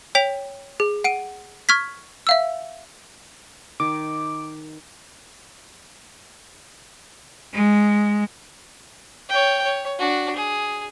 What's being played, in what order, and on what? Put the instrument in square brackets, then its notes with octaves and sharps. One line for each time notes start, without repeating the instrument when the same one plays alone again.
[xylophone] C#5 G5 B6 F7
G#4
F#5 D7 D#7
C#6 F6 G#6 B6
E5 F5 E6
[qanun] D#3 [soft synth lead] D6
[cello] G#3
[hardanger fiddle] C#5 G5
C#5
D4 F#4
G#4